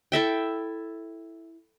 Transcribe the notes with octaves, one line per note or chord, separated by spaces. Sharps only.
E4 A4 E5 G5